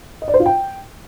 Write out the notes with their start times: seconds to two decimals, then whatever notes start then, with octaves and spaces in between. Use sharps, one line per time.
0.22 D#5
0.28 D5
0.34 C5
0.40 F4
0.46 G5